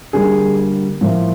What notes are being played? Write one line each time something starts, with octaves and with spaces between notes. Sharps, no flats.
D3 G3 A#3 G#4
A2 F3 A#3